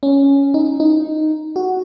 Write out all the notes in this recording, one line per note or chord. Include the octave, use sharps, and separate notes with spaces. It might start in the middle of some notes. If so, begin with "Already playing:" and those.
C#4
D#4
D#4
F#4